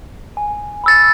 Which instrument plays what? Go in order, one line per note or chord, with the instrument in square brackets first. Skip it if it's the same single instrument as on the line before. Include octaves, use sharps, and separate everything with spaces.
[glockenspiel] G#5
B5 E6 A6